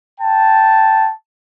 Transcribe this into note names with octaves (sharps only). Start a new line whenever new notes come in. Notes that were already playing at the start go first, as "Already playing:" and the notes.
G5 A5